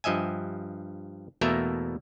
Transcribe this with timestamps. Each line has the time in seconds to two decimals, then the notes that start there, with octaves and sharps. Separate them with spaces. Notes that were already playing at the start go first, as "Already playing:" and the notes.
0.04 G2 F3 D#5 E5 G#5
1.41 E2 B2 A3 A#3 A#4 E5